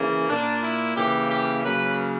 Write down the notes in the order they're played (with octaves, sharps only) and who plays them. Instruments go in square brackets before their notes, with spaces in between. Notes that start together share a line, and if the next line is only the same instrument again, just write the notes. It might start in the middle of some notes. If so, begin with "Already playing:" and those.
Already playing: [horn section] C#3 E3 A#3
A#2 A#3 D4
E4
C#3 E3 A#3 G4
G4
C#3 F#3 A#3 B4